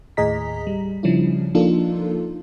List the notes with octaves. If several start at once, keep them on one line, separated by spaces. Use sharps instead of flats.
D#2 A2 G#4 D#5 A#5 B6
G3
C#3 F3 G3 C#4 D4 E4
F3 A#3 D4 D#4 F4 A4